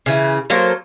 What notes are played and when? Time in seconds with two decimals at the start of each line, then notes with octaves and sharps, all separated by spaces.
0.06 C#3 E3
0.50 F#3 A#3 A4 C5